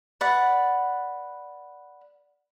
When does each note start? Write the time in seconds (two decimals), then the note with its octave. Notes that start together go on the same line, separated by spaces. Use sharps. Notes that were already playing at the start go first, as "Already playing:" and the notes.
0.21 B4 D5 F#5